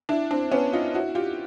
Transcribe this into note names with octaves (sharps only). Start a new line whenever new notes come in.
D4 E4
C4 D4
B3 C#4
D#4 F4
E4 F#4
F4 G4